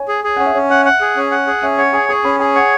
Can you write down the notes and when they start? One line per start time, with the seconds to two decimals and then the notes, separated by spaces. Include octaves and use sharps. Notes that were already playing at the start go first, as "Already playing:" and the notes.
Already playing: C#5 G#5
0.08 G#4
0.24 G#4
0.36 C#4 F#5
0.46 E5
0.55 C#4 C#5
0.70 E5 F#5
0.85 F#5
1.01 G#4
1.16 C#4
1.31 F#5
1.47 G#4
1.63 C#4 E5
1.78 C#5 F#5
1.93 G#4 G#5
2.09 G#4 C#6
2.24 C#4 B5
2.39 G#4 G#5
2.55 C#5 F#5